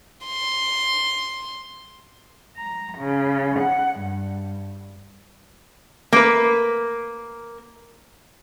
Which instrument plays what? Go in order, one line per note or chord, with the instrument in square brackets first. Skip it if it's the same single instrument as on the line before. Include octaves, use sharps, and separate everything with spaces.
[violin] C6
[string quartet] A#5
C#3
F#5
G2
[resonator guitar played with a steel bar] A#3 B4